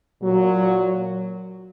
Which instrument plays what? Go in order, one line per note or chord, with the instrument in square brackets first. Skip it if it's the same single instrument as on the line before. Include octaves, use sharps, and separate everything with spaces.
[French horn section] A#2 F#3